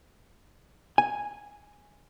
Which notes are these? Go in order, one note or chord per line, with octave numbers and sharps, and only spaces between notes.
G#5